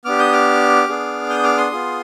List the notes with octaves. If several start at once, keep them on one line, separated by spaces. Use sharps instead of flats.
B3 D4 G4 D6 F6
D#6 G6
D6 F6
B3 D4 G#4
D#6 G6
D6 F6
C6 D#6
B3 F4 G#4